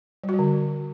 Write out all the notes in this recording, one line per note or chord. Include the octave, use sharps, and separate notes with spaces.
G3
F#4
G3
D3